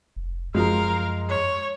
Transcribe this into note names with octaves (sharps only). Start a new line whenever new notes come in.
F1
F#2 F3 G#3 A#4 F5
C#5